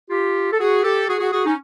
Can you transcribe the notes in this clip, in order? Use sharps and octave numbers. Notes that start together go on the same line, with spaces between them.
F4 G4
A4
F#4 G#4
G4 A4
F#4 G#4
F#4 G#4
F#4 G#4
C#4 D#4